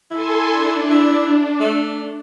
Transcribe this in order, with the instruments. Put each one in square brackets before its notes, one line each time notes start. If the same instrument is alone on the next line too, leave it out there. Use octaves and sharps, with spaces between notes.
[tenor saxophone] E4 [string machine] A4 G#5 C6
[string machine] D4
[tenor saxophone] E4
A3